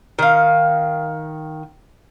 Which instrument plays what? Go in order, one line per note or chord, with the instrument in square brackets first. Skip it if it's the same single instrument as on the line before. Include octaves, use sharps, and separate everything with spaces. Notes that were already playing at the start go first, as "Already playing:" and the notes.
[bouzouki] D#3 F5